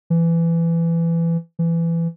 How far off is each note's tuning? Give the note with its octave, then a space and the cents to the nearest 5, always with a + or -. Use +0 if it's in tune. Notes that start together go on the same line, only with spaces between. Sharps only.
E3 +20
E3 +20